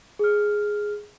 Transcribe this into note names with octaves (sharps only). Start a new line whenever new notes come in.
G#4 F6